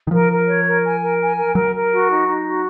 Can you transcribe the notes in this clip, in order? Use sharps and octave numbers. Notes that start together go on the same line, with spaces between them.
D#3
F3 A#4
A#4
C#5
A#4
G#5
A#4
G#5
A#4
F#3 A#4
A#4
F#4
D#4
D#4
F#4